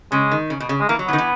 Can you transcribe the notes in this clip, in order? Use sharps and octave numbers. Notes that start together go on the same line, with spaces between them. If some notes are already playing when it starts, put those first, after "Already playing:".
C#3 G#3
D#3
C#3
B2
C#3
G#3
E3 A#3
F#3
E3 B3
D#3
E3